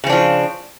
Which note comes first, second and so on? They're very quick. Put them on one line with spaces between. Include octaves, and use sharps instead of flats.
C#3 C4 D4 F3